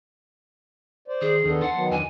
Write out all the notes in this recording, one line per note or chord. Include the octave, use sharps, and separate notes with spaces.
C5 D5
D#3 G#4
D#2 D#3 B3 D4 A4
F#5 A5 C6
D#3 F#3 B3
E2 D3 G#5